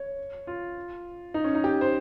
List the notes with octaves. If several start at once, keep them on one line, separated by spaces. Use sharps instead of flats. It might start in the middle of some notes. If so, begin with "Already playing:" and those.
Already playing: C#5
F4
D#4
C#4
D#4
G4
C5